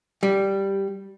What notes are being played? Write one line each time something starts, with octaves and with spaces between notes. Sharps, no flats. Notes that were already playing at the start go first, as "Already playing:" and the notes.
G3